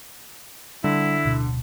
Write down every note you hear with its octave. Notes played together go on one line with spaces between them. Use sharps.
D3 G3 E4
D1 B2